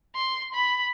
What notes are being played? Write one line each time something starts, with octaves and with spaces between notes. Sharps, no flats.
C6
B5